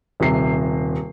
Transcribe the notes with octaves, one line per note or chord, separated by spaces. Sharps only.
D#1 C3 C7